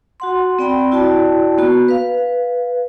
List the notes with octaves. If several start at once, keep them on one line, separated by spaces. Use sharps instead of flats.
F#4 F#5 C6
C4 D5 G5 B5
E4 F#4 D5 G5 A5
A#3 B3 F#4
B4 F5